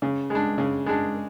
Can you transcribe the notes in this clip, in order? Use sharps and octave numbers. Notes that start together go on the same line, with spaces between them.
C#3
G#3 D4
C#3
G#3 D4